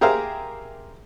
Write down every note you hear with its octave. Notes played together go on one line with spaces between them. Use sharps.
G4 G#4 A#4 C5 E5 F5